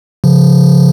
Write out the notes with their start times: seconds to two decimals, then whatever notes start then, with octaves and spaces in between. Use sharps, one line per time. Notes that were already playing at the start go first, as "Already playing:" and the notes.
0.24 C#3 F3